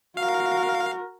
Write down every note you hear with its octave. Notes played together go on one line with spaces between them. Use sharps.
F#4 A#4 F5